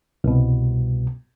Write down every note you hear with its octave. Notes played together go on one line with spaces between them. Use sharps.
C2 B2